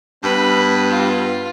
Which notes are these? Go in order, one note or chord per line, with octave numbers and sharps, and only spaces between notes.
G2 B3 B4
F4